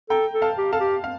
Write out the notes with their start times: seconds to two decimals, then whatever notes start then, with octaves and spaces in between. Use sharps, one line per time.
0.10 A4 G5 A#5
0.33 A4
0.42 F5 A5
0.58 G4
0.72 A4 F5 A5
0.80 G4
1.04 F5